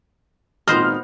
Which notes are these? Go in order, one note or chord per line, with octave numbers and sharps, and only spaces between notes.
G#1 A#2 B3 C5 D#5 F6